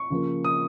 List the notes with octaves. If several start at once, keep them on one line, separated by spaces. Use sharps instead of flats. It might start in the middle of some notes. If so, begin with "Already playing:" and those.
Already playing: C#6
C#3 F3 A#3
D#6